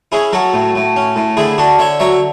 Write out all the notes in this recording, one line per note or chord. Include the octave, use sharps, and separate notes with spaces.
C#4 E4 G#4
F#3 F#4 A4
A2
A2
C#4
A2
D3 E4 G#4
D3 D4 F#4
D3 C#5 E5
F#3 C#5 E5